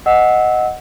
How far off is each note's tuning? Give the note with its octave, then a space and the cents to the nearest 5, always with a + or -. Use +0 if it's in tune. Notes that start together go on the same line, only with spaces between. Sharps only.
D#5 +0 F#5 +0 E6 -20